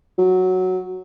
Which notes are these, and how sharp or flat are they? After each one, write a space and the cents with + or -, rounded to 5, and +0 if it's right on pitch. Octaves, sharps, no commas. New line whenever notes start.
F#3 +0